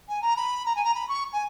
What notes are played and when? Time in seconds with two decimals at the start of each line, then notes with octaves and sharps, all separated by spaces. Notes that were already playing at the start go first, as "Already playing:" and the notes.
0.08 G#5
0.22 A#5
0.36 B5
0.66 A#5
0.75 G#5
0.84 A#5
0.95 B5
1.09 C#6
1.33 G#5